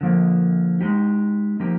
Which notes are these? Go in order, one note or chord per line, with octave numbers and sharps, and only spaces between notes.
D3 F3 A#3
G#3 D#4 G4
F3 A#3 D#4 G4